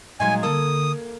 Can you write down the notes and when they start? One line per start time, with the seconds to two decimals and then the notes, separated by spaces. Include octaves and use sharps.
0.20 A#2 F#3 G#3 D#4 G#5 C6 G#6
0.43 D3 A#3 A4 D#6